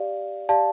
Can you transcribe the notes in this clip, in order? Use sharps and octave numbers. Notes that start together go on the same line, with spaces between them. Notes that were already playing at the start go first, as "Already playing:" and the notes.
Already playing: G4 D5 F5
G4 D5 F5 A5